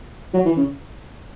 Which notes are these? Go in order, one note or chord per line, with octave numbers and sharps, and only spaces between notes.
F#3
E3
C#3